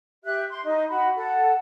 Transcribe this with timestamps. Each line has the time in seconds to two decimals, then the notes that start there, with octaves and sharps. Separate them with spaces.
0.24 G4 E5 F#6
0.51 C6
0.64 D#4 D#5
0.89 F#4 B5
1.16 A4 F#5